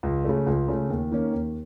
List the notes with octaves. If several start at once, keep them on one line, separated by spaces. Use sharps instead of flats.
C#2
C#3 A3
C#2
C#3 A3
D#2
D#3 A#3 C#4
D#2